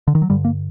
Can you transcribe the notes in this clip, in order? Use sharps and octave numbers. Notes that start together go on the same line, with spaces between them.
D3
D#3
F#3
G2 D3 G3
A#3